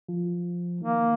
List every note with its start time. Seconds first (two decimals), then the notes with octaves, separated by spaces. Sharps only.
0.08 F3
0.81 D#3 A#3